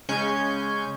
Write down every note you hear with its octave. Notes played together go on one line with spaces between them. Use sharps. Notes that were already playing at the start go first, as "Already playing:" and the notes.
C#3 G#3 C#4 G#5 C#6 G6